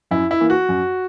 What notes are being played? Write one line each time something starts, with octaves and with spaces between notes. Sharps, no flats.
F#2 E4
E4
E3 A#3
F#4
F#2